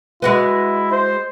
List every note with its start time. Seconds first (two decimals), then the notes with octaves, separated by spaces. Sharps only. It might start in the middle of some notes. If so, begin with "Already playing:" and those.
0.22 G#3 E4 F#4 B4
0.92 C5